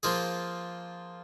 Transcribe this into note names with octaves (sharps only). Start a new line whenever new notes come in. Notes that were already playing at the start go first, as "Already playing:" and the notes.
F3 A#3 F4 G#4